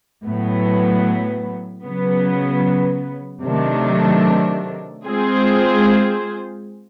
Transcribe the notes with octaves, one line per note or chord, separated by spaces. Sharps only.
A2 F#3 B3
C#3 F#3 B3
C3 D#3 F#3 A3 D4
G#3 C4 F4 G#4 C5